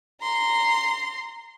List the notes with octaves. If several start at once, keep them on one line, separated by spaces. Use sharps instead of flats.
A#5 C6